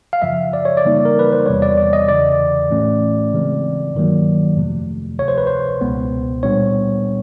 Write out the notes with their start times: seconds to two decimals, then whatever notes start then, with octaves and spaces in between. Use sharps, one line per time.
0.13 F5
0.22 F#2 C#3 F3 E5
0.53 D5
0.65 C#5
0.77 D5
0.84 C#3 E3 G3 A#3 D#4
1.05 A#4
1.19 B4
1.32 C5
1.46 E2 C3 E3 G3 B3 C#5
1.62 D5
1.78 D5
1.93 D#5
2.08 E2 C#3 E3 D5
2.70 A2 E3 A3 C#4
3.33 C#3 E3 G#3 C4
3.94 G2 D#3 F#3 A#3
4.56 F2 C3 F3 A3
5.19 D2 C3 F3 C#5
5.28 C5
5.38 B4
5.47 C5
5.81 C#2 B2 G#3 B3
6.43 A#2 G3 B3 D4 C#5